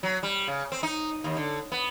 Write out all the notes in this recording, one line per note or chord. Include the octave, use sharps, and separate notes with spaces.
F#3
G3
C#3
C4
D#4
D#2
D3
B3